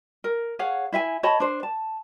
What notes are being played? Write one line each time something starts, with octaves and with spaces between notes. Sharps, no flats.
A#4
G#4 C#5 F5 F#5
E4 E5 F5 G#5
C#5 D#5 A5 B5
D4 C5
A5